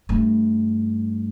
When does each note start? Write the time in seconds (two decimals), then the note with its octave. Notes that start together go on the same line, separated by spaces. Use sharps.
0.09 G2 A3